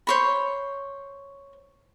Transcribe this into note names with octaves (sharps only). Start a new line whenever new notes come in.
C5 C#5 B5